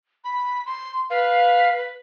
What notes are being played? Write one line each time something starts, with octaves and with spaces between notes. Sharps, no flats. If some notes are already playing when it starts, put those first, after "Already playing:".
B5
C6
B4 F5